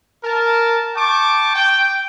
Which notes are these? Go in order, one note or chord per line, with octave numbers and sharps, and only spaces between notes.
A#4 A5
G5 A5 C#6 D6
G5